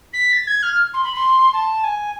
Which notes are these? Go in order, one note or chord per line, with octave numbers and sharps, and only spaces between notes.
B6
A6
G#6
F6
C6
B5
C6
A5
G#5